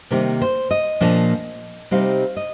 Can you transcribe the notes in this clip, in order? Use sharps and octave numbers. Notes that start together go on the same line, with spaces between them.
C3 D#3 G3 A#3 D#4 A#4
C5
D#5
A#2 F3 A#3 D4
C3 G3 C4 D#4 F5
D#5